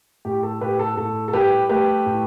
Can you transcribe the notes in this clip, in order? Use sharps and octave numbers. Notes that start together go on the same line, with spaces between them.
A2 G4
A4
A2 G4 B4
A4
A2 A4
A4
G3 G4 B4
A3 G4 B4
A2